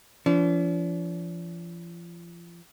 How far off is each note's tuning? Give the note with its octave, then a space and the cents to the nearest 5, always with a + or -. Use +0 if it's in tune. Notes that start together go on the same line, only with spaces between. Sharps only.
F3 -35 D4 -45